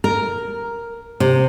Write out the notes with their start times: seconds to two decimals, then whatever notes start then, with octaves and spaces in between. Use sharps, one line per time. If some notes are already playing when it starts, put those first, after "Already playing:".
0.04 A#4
1.20 C3